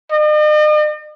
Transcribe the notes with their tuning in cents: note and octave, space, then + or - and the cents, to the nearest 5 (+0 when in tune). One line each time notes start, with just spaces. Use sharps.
D#5 -45